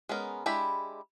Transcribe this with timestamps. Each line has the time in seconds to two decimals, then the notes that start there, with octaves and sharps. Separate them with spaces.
0.09 G#3 B3 C#4 A#4
0.46 G#3 D4 E4 G4 B5